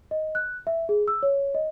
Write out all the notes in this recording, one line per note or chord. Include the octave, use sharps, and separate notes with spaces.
D#5
F#6
E5
G#4
E6
C#5
D#5